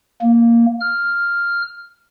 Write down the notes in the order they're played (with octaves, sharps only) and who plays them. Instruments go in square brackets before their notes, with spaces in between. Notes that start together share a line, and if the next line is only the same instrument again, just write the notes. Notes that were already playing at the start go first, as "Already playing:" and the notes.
[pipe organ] A#3
F6